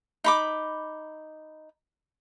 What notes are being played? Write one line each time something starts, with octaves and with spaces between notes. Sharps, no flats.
D#4 B5 D6